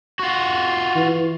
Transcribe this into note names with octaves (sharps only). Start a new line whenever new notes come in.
F4 F#4
E3